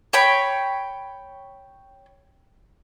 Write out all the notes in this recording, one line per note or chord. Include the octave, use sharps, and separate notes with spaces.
C#5 G5 B5